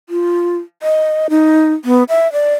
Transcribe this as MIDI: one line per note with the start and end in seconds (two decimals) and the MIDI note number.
0.09 0.57 65
0.83 1.27 75
1.30 1.74 63
1.85 2.03 59
2.09 2.31 76
2.32 2.54 74